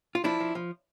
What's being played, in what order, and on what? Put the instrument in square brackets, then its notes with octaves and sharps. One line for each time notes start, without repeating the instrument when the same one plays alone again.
[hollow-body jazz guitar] F4
F3 D4 E4
F3
F3